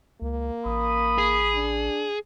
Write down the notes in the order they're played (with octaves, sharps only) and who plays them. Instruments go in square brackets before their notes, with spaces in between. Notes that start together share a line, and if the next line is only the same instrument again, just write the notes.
[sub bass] C#2 [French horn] A#3
[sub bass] A1 [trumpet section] B5 D#6
[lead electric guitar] G#4
[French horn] D4